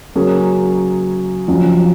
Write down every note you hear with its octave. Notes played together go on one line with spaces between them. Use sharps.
C#3 F#3 A#3 C#4 G#4
F2 C#3 F#3 C#4 F4